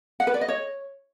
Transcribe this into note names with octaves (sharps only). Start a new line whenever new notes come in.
F#5
B4
D5
D#5
C#5